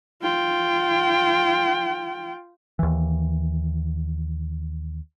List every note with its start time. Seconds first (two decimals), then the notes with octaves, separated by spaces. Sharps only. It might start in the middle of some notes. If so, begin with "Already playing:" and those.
0.22 F4 G5
2.79 D#2 E3